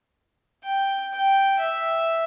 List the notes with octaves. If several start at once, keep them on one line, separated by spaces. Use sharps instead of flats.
G5
G5
E5